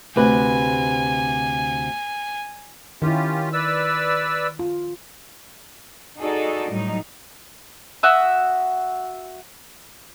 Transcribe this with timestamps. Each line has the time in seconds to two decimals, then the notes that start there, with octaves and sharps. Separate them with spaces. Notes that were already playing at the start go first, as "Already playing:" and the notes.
0.16 D2 C3 B4 G#5
3.02 D#3 C#4 E4 F4 G4
3.53 B4 D5 E6
4.59 F4
6.19 D#4 F#4 G#4 A4 D5 D#5
6.71 A2 F#3 G3 D#4
8.03 F#4 E5 D#6